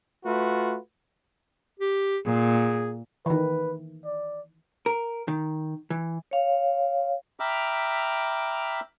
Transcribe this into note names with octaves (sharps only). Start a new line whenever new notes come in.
A3 F4 F#4 B4
G4
A#2 G#4
D#3 E3 B4
D5
A#4
D#3
E3
C#5 F5
E5 G5 A#5 B5 D6 F6